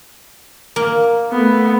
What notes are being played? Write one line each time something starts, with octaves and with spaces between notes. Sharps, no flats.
A#3
A3 B3